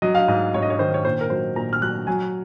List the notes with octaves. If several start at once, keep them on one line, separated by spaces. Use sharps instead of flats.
F#3 D#5
F5
G#2 D#5
G#2 C#5
D#5
C#5
D#3 C5
C#5
A#2 C5
A#4
F#3 C5
A#2 A#5
F6
F#3 F#6
F#3 G#5